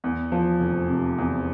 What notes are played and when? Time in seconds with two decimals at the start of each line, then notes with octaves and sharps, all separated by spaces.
0.04 E2
0.32 F3
0.60 F1
0.89 C3
1.18 E2